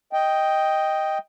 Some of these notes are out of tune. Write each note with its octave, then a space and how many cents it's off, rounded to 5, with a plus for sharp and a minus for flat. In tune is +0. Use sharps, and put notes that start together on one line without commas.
D#5 +5 G5 +0